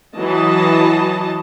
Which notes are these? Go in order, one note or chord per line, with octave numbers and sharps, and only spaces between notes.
E3 F#3 D#5 A5